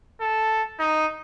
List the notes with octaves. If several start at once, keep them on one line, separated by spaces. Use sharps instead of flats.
A4
D#4